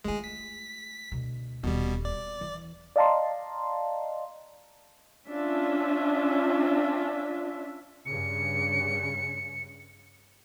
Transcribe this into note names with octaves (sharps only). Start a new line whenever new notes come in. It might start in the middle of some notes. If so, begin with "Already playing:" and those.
G#3 A3 F4 G#4
B6
D2 B2
D#1 B2 G3 C4
D5
E3
D5 D#5 F5 A5 A#5 C6
C#4 D4 F4 E5
G2 C#3 C#7